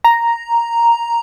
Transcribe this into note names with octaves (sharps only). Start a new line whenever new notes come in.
A#5